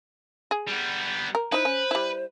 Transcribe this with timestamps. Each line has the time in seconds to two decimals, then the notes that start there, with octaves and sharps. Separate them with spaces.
0.51 G#4
0.67 G3 B3
1.35 A#4
1.52 D#4 E4 B4 C5
1.65 C#4
1.91 G3 E4